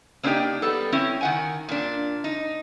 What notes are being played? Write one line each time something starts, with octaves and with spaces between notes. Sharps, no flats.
A#3 C4 D4 D#4 G4 G5
G3 B3 A4
C4 C#4 E4
D#3 F#5 G#5
A#2 D4
D#4